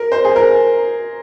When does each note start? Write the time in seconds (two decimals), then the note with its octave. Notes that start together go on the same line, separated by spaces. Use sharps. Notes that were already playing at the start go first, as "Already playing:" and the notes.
Already playing: A#4
0.12 C5
0.25 G#4
0.36 A#4